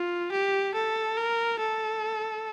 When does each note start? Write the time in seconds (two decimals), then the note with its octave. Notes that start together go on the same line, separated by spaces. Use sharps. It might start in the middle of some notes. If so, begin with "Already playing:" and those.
Already playing: F4
0.32 G4
0.74 A4
1.17 A#4
1.59 A4